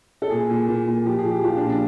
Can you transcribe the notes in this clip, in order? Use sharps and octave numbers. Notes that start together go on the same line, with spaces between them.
A4
A#2 G#4
A#2
A#2
A#2
F3 G4
G#4
F3
G4
F3 F4
D4
A#2
D4